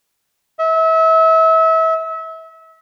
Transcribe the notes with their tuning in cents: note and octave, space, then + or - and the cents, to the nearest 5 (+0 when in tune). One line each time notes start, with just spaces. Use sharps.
E5 -30